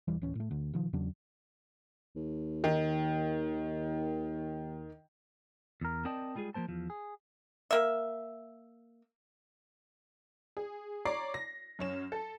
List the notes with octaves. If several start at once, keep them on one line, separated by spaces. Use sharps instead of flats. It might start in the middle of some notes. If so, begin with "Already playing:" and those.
E1 E3 G3
D1 E3 C#4
A2 A3
D2
B2 D#3 F3
E2 C#3 F#3 D4
D#2
D#3
E2 A#4
C4 A#4 D5 D#5 G5 A5
G3 G#3 F4 F#4 G#4
F3 A3 A#3 C5 A5
E2 F3
G#4
A#3 E5
G#4
C#5 D5 A#5 D6 C7
A#6
F#2 C#4 E7
A4